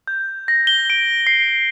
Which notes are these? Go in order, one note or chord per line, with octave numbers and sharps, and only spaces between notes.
G6
A#6
G7
D7
C7